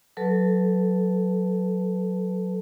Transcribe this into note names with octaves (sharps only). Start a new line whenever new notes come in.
F#3 A4 B4 A5